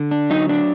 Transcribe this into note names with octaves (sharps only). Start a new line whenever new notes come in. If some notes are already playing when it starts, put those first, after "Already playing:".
Already playing: D3
D4
F#3 D#4
D4